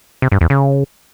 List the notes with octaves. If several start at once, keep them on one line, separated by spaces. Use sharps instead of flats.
C3
G2
E2
C#3